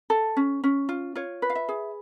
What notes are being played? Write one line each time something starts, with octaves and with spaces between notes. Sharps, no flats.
A4
C#4
C#4
F4
F4 C#5
B4
F5
E5
G#4